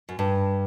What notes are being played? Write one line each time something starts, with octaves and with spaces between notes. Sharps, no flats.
F#2
G2